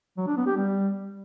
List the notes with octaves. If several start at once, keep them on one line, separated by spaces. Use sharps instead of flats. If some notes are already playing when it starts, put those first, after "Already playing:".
F#3
D4
B3
G4
G3